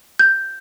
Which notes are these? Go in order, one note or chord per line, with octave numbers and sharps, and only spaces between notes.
G6